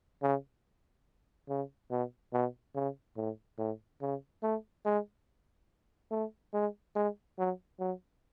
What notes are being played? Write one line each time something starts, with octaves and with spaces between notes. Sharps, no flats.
C#3
C#3
B2
B2
C#3
A2
A2
C#3
A3
G#3
A3
G#3
G#3
F#3
F#3